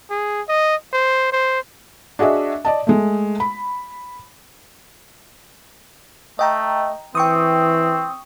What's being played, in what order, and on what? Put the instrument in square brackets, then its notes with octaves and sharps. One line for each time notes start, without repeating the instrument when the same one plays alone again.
[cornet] G#4
D#5
C5
C5
[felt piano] D4 F#4 G#4 D#5 E5
D5 D#5 A5
G#3 A3
B5
[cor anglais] A3 [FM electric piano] D#5 G5 A#5
[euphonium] E3 [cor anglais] C4 [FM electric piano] G5 C#6 D#6